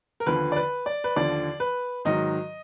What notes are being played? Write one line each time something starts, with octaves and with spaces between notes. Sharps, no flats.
A#4
D#2 D3 F3 B4
D5
B4
D5
B4
D#2 D3 F3 D5
B4
G#2 D#3 F#3 D#5